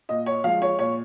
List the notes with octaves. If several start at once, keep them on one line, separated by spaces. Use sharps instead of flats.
A#2 D#5
C#5
F3 G#3 F5
C#5
A#2 C#5